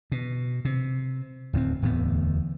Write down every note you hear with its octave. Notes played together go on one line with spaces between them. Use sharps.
B2
C3
D1 D#2 B3 C4
D1 E2 A2 B3